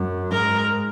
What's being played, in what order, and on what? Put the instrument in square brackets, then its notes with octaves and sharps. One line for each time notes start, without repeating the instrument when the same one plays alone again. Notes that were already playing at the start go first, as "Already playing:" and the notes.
Already playing: [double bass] F#2
[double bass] G#2 [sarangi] A#4